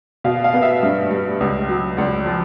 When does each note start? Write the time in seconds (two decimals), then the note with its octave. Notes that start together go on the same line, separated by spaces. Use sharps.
0.24 B2 F5
0.44 F5
0.53 B3
0.63 E5
0.83 G2
1.10 G3
1.40 C#2
1.69 F#3
1.97 C#2 D5
2.26 F3